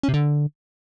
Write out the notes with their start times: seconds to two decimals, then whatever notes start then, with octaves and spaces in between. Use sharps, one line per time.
0.03 C#4
0.09 C3
0.14 D3